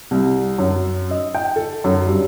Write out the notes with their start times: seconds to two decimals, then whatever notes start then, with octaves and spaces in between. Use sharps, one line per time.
0.11 C2
0.58 F#2
1.11 D#5
1.35 G5
1.56 A4
1.84 F#2
2.06 G2